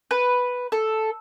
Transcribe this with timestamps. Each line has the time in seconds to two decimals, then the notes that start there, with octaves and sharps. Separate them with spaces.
0.11 B4
0.72 A4